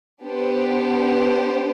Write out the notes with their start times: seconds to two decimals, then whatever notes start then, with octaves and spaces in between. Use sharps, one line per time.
0.23 B3 D4 G4 C5